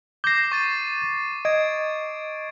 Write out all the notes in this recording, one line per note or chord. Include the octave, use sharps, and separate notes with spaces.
D6 G6 A#6 C7
C#6 A6 D#7
D#5 G#6 D7